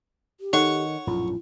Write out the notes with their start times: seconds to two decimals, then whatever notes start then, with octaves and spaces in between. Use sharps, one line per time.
0.40 G4
0.53 D#3 D#4 A4 C#5 F#5 C#6
1.07 A#1 F#2 A2 F4